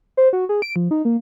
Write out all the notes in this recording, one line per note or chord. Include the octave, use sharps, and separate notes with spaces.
C5
F#4
G#4
D7
F3
D#4
A#3